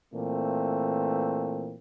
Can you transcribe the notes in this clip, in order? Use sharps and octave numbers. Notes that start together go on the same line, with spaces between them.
A#2 E3 A3 C4